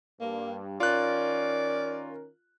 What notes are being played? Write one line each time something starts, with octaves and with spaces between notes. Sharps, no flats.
G2 A#3
D#3 C#4 F4 A#4 D5 F#6